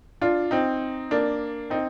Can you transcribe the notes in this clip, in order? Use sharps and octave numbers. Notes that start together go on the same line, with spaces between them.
D4 F4
C4 D#4
A#3 D4
C4 D#4